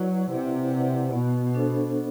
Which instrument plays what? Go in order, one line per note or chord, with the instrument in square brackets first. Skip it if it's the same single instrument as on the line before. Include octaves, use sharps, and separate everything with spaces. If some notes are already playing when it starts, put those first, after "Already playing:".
Already playing: [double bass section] F#3 [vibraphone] E4 B4 D5 F#5
[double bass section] C3 [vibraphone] E4
[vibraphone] B4 D5 F#5
[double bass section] B2 [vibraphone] B3
[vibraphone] D4 A4 C5